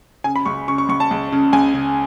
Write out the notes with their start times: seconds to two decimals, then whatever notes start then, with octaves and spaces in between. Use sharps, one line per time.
0.24 C#3 G#5
0.36 B5
0.46 C#2 C#6
0.68 C#3 C#6
0.78 C#6
0.88 C#2 C#6
1.00 A5
1.11 C#2
1.32 C#3
1.53 C#2 G#5
1.74 C#3